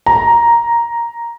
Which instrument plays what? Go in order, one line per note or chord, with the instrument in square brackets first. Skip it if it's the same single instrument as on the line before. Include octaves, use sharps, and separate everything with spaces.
[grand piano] A#5